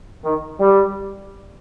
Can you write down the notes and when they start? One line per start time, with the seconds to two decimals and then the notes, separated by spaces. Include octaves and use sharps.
0.22 D#3
0.59 G3